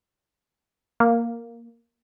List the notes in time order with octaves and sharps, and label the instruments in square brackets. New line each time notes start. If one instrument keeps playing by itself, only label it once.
[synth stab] A#3